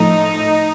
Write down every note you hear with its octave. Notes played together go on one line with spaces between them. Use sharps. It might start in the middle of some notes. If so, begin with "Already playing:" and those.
Already playing: A2 F3 A3 D#4